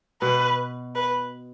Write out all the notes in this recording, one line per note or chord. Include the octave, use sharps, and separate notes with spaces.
B2 B4
B4